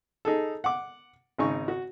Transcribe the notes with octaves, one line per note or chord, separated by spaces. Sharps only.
D#4 G#4 A4
F#5 D6
G#1 C#3 D#4 C#6
F#4